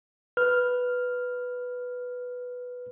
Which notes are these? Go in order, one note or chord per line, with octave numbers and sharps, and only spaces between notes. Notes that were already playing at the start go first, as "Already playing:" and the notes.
B4 F6